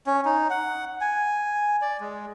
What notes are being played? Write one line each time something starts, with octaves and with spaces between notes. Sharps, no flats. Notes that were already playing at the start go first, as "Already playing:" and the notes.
C#4
D#4
F#5
G#5
D5
G#3